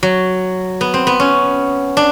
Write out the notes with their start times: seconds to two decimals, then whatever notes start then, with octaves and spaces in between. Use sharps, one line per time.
0.03 F#3
0.81 B3
0.94 C4
1.07 B3
1.20 C#4
1.97 D4